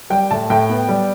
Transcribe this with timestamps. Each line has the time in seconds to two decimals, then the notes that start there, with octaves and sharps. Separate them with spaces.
0.10 G3 G5
0.31 A2 A5
0.50 A2 G5
0.69 B3
0.89 G3